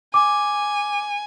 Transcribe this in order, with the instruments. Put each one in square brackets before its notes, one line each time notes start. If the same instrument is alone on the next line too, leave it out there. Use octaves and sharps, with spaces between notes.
[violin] G#5 [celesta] D6